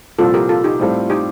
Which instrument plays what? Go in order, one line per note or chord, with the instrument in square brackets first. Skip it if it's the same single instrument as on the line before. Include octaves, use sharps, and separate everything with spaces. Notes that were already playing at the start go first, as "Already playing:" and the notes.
[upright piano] C2 A#2 F3 [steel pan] F4 A4
[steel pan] G4 A#4
F4 A4
D#4 G4
[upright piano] A2 G3 C4 F4 A4
[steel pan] D#4 G4